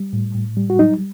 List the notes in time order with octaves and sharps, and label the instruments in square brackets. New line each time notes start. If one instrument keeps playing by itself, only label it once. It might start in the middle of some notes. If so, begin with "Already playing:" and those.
Already playing: [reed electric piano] G3
A2
A2
G3
F#4
F#3 D#4